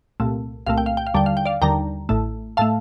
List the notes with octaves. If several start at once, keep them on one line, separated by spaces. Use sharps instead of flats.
C2 A#2 A3
C2 A#2 A3 F5
G5
F5
G5
F5
D#2 D3 G3 G5
F5
G5
D5 F5
D#2 D3 G3 G5 A#5
A1 A2 A3
A2 A3 F5 A5